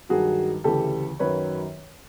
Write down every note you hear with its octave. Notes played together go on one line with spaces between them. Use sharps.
G2 D#3 F#3 F#4 G#4
D2 C#3 E3 G4 A4
F#2 D#3 F#3 B4 C#5